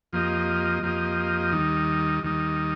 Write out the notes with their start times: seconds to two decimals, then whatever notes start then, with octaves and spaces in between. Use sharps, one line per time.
0.13 F2 F3 A#3 G4 D#5
0.83 F2 F3 A#3 G4 D#5
1.52 D#2 D#3 G3 D#4
2.23 D#2 D#3 G3 D#4